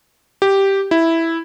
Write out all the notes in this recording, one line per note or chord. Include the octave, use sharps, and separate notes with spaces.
G4
E4